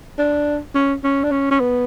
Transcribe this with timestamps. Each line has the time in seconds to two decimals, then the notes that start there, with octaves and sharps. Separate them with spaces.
0.18 D4
0.75 C#4
1.04 C#4
1.24 D4
1.31 C#4
1.51 C#4
1.60 B3